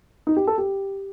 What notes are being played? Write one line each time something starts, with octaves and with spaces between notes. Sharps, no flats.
D#4
G4
A4
G4